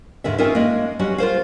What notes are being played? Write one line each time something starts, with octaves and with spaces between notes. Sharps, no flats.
D#2 G#2 D3 A#3 E5
C4 C#4 D#4 F4 A#4 E5
G#3 A#3
F#3 G3 C#4 F#4
F4 A#4 C5 F5